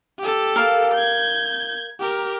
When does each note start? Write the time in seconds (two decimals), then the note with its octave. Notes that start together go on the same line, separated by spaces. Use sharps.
0.19 G4 A4
0.56 A#4 F5
0.94 G6 G#6
2.00 G4 A#4